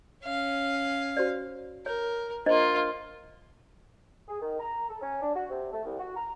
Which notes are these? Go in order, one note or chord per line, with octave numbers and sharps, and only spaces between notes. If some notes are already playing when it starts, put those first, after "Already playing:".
C#4 F5
F#4 C5 D5
A#4 C#5
A#3 D4 F4 C5 D#5
G#4
D#3
A#5
A4
C#4
D4
F#4
C3
A3
C2
F#4
A#5